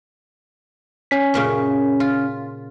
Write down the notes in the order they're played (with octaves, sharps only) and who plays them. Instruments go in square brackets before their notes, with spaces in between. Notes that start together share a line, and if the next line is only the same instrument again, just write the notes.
[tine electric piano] C#4 B6
[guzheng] F#2 A#2 C#3
F4